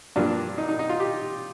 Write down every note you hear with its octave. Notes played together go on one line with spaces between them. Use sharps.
G2 F3 A#3 D4
D#4
D#4
D#4
F4
G4